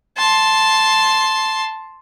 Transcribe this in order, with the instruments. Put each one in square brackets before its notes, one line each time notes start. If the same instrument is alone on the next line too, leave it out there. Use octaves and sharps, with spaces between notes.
[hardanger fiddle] A5 C6